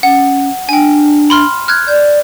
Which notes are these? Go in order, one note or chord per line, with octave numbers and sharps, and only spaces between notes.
C#4 F#5
D4 G5 G#5
B5 C6 F6
F6 F#6 G#6
D5 G6